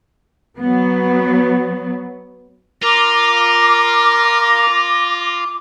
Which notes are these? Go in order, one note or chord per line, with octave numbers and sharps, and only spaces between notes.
F#3 B3
F4 A#4 D6 A#6